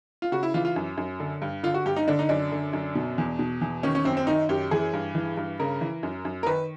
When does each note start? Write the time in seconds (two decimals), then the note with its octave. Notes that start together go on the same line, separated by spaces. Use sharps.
0.22 F4
0.32 C#3 F#4
0.43 E4
0.54 E3 F4
0.65 F4
0.76 F#2
0.97 F#2
1.20 D3
1.42 G2
1.63 D3 F4
1.74 F#4
1.86 G2 G4
1.96 D#4
2.08 D3 D4
2.19 D#4
2.29 F#2 D4
2.52 D3
2.73 F#2
2.95 B2
3.18 E2
3.39 B2
3.61 E2
3.83 D#3 C#4
3.95 C#4
4.05 F#2 C4
4.17 C4
4.27 D#3 D#4
4.49 F#2 G4
4.71 E3 G#4
4.93 G2
5.15 E3
5.37 G2
5.59 C#3 A#4
5.81 E3
6.03 F#2
6.25 F#2
6.43 A#4
6.46 D#3 B4